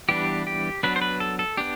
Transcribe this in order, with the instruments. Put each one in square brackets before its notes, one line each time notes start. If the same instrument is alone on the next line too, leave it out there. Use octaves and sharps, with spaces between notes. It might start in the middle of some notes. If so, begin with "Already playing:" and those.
[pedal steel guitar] E3 G3 B3 D4 G4
G4
F#3 B3 D4 B4
C5
B4
A4
A4
B3 D4 G4